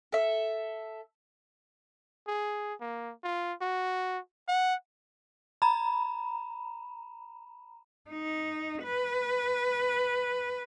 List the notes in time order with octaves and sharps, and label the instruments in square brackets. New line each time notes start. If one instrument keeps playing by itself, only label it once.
[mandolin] A4 E5
[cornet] G#4
A#3
F4
F#4
F#5
[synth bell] A#5 B5
[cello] D#4
B4